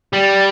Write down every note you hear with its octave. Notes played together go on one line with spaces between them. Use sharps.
G3